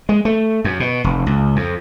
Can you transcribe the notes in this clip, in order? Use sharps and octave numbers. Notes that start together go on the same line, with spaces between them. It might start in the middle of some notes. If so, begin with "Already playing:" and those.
G#3
A3
F#2
B2
F1
C#2
F2